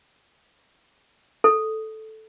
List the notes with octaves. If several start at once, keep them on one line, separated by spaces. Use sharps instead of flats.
A4